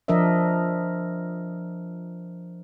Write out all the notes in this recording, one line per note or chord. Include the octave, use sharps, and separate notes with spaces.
F3 D4 A#4 D#5 E5